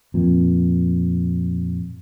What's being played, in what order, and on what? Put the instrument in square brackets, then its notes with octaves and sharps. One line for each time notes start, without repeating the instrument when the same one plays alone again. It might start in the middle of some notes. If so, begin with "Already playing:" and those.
[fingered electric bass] F2 A#2